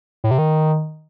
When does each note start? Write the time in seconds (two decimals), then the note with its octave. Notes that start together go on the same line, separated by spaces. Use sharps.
0.24 A2
0.31 C3
0.38 D#3